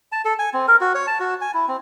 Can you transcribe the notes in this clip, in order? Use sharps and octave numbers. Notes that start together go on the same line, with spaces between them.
A5
A4
G#5
C4
A#4
F#4
C#5
A5
F#4
G#5
E4
C4